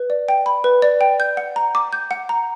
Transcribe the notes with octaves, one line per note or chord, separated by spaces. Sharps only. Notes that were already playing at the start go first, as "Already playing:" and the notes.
Already playing: B4
D5
G5
B5
B4
D5
G5
G6
F#5
A#5
D6
G6
F#5
A#5